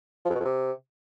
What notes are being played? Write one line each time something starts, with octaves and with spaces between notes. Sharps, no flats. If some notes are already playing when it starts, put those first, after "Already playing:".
F3
F2
B2
F2
C3